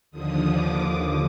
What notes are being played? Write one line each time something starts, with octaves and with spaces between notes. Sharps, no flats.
D#2 D3 F3 D#6
D6